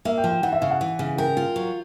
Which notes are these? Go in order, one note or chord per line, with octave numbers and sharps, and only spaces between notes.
A#3 E5
G5
F3
G5
E3 F#5
E5
C#3 F5
F#5
E3
C#3
A#4 G5
F4
F#3